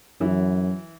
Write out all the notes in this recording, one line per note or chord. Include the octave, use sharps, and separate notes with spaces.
F#2 E3